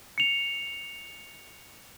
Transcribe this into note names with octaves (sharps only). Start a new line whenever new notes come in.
C#7 F7